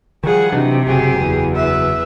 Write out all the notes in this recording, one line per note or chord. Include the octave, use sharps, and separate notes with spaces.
D#3 F3 G3 G#4 F#5
C3 E3 F#3 D4 D#4
F#1 F#3 G4 G#4
E2
B4 E5